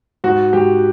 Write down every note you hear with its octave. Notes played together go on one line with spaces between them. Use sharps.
G#2 F#4
G#2 G4